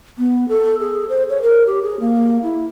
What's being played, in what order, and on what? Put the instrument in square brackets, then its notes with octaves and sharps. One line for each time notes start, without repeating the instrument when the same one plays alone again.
[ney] B3
A4
G#4
C5
C#5
A#4
G4
G#4
A#3
E4